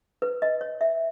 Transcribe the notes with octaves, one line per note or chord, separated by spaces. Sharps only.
B4
D#5
C#5
E5